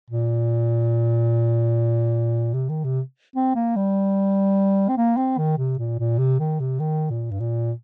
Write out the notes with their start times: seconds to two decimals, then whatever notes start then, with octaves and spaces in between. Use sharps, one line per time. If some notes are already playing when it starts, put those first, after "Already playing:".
0.10 A#2
2.54 C3
2.69 D#3
2.84 C3
3.36 C4
3.55 A#3
3.76 G3
4.89 C4
4.97 A#3
5.17 C4
5.38 D#3
5.58 C3
5.78 A#2
5.99 A#2
6.18 C3
6.40 D#3
6.60 C3
6.80 D#3
7.10 A#2
7.31 G2
7.40 A#2